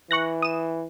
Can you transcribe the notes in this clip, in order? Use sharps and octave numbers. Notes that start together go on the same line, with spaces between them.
E3 C#6 F#6 A#6
D#6 E7